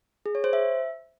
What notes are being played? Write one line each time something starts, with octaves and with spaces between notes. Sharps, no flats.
G#4
C#5
C5
E5